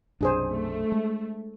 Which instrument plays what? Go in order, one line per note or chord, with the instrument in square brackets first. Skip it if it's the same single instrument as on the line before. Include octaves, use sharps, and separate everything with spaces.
[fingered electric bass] B1 F#2 C3 [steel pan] D4 G#4 C5
[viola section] A3
[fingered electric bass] G#3